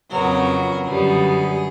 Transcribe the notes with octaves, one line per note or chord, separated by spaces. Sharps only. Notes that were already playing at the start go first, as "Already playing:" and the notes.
F2 C#3 F#3 B3 A#4
F#2 D3 G3 B3 G#4